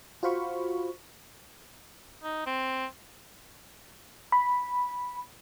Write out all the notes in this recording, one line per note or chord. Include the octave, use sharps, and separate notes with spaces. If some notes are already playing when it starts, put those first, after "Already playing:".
F4 F#4 C5 F5 B5 C#6
D#4
C4
B5